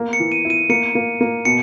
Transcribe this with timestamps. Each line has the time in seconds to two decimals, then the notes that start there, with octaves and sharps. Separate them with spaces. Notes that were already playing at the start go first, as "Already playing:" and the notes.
Already playing: A#3
0.13 C#7
0.20 E3
0.32 D#7
0.45 E4
0.50 D#7
0.69 A#3 C#7
0.95 A#3
1.21 A#3
1.45 B2 C#7